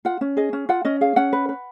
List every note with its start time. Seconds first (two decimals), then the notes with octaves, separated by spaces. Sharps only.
0.05 F4 F#5
0.21 C#4
0.37 G#4 D#5
0.53 C#4
0.69 F4 F#5
0.85 C#4 D#5
1.01 G#4 F5
1.16 C#4 F#5
1.33 B4
1.49 B4